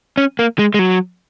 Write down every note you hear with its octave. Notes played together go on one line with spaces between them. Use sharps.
C#4
A#3
G#3
G#3
F#3